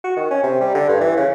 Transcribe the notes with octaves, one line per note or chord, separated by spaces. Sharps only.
F#4
D#3
C#4
C3
G3
D3
G2
E3
C#3